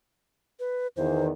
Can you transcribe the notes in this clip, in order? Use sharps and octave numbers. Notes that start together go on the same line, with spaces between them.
B4
E2 D#3 C5